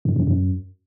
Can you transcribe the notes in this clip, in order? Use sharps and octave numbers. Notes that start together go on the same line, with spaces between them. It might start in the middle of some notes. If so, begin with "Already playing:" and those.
G2
F#2
F#2